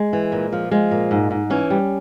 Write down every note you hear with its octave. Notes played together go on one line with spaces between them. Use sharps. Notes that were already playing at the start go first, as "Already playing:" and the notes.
Already playing: G#3
E3
A#2
F3
F3 G#3
A#2
G#2
G#2
E3 C#4
G3